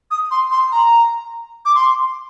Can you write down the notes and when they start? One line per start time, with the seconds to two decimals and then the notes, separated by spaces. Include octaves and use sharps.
0.11 D#6
0.31 C6
0.51 C6
0.72 A#5
1.65 D6
1.75 C6